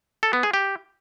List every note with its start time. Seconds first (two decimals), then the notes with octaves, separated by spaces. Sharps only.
0.23 A4
0.33 B3
0.43 G#4
0.54 G4